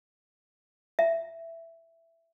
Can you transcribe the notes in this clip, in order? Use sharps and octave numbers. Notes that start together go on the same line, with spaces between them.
E5